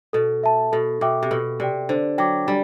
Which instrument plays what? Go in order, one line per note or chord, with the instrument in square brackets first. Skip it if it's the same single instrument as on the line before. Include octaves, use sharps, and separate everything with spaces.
[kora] B2 [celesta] A4
[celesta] E5 A5
[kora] B2 [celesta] A4
[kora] B2 [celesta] E5 G5 D6
[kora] C3
[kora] B2 [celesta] A4
[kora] C3 [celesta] D5 G5
[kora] D3 [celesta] C5
[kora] F#3 [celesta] G5 D6
[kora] G3 [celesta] D4